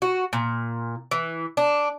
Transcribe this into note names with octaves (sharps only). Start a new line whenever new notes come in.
F#4
A#2
E3
D4